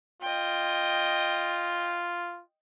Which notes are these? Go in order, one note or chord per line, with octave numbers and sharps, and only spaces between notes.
F4 D#5 G5